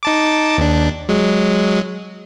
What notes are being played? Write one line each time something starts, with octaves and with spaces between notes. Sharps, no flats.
D#4 A5 D6
D#2 D4
F#3 G#3